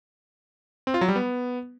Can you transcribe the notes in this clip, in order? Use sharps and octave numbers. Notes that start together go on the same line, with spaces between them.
C4
F4
F#3
G3
B3